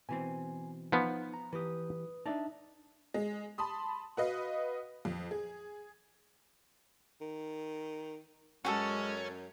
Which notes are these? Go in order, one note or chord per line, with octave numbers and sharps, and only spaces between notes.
B2 E3 C4 G#5
F3 B3 D#4
A#5
E3 G4 B4 D#6
D4 D#4 D5 E5 A5
G#3
A5 B5 C6 D#6
F#4 B4 D#5 F5
F2
G#4
D#3
F#2 G#3 C#4 F#4 G4 A4